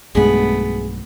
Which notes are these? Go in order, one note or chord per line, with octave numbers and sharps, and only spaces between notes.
B1 G2 G#3 A3 B3 G#4